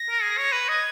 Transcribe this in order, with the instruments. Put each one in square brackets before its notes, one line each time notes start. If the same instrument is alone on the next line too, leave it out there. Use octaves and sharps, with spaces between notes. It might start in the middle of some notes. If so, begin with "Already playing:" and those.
Already playing: [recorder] A#6
[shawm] A#4
G#4
C#5
B4
[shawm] D#5 [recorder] G#6